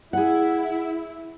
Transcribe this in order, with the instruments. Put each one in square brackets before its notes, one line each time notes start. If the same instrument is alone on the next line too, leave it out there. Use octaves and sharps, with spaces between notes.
[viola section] E4 [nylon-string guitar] G#4 F#5